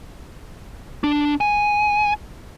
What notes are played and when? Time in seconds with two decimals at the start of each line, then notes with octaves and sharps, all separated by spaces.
1.04 D4
1.41 G#5